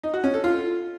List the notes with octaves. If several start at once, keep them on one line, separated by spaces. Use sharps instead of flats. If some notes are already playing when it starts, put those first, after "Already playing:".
D#4
F#4
C#4
A4
F4